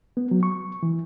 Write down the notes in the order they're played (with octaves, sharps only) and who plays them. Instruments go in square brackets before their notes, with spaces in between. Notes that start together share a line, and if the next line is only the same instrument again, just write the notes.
[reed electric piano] B3
F#3
C#6
E3